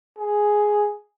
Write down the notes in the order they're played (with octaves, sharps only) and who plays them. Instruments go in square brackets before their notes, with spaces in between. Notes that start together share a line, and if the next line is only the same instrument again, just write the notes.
[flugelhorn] G#4